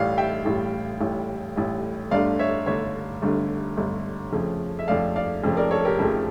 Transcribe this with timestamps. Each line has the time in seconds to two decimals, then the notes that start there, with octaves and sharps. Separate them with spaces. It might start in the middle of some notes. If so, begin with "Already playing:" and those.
Already playing: A1 A2 G3 D5 F5
0.18 E5 G5
0.45 A1 A2 G3
1.01 A1 A2 G3
1.56 A1 A2 G3
2.11 G1 G2 D3 A3 D5 F5
2.39 C#5 E5
2.66 G1 G2 D3 A3 C#5 E5
3.22 G1 G2 D3 A3
3.77 G1 G2 D3 A3
4.32 F2 C#3 F3 A3
4.79 E5
4.88 F2 C#3 F3 A3 D5 F5
5.16 D5 F5
5.44 F2 C#3 F3 A3
5.57 A#4 D5
5.71 A4 C#5
5.85 G4 A#4
5.99 F2 C#3 F3 A3